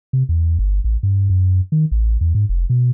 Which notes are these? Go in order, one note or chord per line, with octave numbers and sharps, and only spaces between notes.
C3
E2
G1
A1
G2
F#2
D#3
A1
E2
G#2
F1
B2